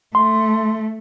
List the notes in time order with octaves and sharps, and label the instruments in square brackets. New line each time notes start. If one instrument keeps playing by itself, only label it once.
[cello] A3 [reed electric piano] C6